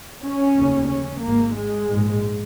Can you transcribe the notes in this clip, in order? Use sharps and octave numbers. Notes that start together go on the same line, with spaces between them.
C#4
F1 D#2 C#3
C#4
G#1 G#2 A#3
G#3
A#1 G#2